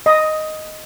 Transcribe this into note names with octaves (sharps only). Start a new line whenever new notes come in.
D#5